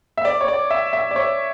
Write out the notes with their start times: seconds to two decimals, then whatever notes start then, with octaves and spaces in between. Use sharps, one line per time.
0.18 E5
0.25 D5
0.41 C#5
0.48 D5
0.70 E5
0.93 E5
1.11 D5
1.16 C#5